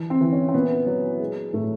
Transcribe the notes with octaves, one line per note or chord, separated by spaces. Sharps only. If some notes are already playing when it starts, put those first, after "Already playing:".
Already playing: E3
C4
E3
C#4
C4
A#2 B3
F#3
G#3
A2 A3